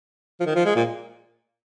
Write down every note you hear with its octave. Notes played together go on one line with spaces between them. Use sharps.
F3
D#3
F3
G#3
A#2